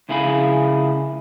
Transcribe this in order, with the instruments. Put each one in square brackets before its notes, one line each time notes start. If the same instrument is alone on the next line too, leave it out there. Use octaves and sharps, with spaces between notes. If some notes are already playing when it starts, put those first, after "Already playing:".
[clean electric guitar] C#2 C#3 E4 G#4 F5 B5